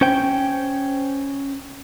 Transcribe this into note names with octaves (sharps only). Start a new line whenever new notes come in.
C#4 C5 G5